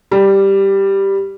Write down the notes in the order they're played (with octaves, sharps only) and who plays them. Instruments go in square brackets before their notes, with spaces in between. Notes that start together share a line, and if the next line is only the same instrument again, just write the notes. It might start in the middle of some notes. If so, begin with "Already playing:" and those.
[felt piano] G3